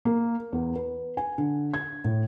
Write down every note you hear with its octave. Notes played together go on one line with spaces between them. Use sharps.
A#3
E2
B4
G#5
D3
G#6
A2